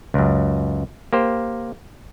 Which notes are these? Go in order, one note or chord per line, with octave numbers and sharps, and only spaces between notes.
C#2 F#2
A#3 G4 C5